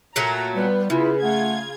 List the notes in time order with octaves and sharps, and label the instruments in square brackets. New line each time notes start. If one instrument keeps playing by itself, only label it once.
[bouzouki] A#2 F#3 A3 [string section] A#5
[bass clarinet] G3 [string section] B3 F4 [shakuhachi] B4
[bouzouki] C#3 [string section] B3 B4 [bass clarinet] E4 [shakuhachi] F4
[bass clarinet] A3 [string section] F4 G#6 [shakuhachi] F#5